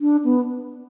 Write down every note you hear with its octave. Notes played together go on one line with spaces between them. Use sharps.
D4
B3